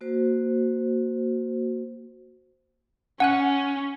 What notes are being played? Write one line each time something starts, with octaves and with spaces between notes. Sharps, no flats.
A#3 F#4 C5
C#4 F#5 G#5 F#6